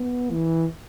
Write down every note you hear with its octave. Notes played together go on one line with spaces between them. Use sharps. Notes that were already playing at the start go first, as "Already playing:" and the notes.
Already playing: B3
E3